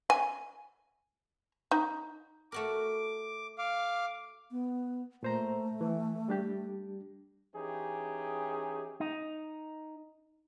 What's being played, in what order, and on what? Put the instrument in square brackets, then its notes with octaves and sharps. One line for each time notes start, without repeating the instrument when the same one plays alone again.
[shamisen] G#5
D#4
[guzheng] A3 F#4 A#4 [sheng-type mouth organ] D6
[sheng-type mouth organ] F5 D6
[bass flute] B3
[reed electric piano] A#2 C5 A#5 [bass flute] A3
[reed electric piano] E3
G3 D4 G4
[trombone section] E3 C#4 D#4 G4 G#4
[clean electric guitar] D#4